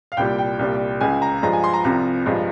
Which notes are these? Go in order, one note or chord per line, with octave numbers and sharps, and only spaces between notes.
F5
C2 A#2 G3 G5
G5
C2 A#2 G3
C#2 C#3 G#3 G#5
A#5
G2 F3 G#3 A#5
G#5
C6
A#5
C2 C3 F3 A#5
G2 F3 G#3